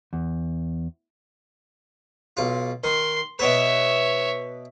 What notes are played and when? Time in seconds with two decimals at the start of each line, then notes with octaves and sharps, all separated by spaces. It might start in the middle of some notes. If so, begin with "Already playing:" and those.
0.13 E2
2.37 B1 F4
2.84 D#3 C6
3.39 B2 B3 B4 C#5 E5